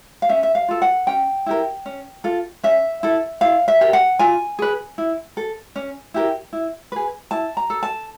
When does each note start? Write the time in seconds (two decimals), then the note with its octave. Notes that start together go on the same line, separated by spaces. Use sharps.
0.22 F5
0.29 C#4 E5
0.43 E5
0.55 F5
0.68 F4 A4
0.82 F#5
1.07 C#4 G5
1.46 E4 G4 A#4
1.86 C#4
2.24 F4 A4
2.63 C#4 E5
3.03 E4 A4
3.41 E4 F5
3.68 E5
3.81 G4 A#4
3.93 F#5
4.19 F4 G#5
4.59 G#4 B4
4.98 E4
5.37 A4
5.76 C#4
6.14 E4 G4 A#4
6.53 E4
6.92 G#4 B4
7.31 E4 A5
7.57 A#5
7.70 A4
7.83 A5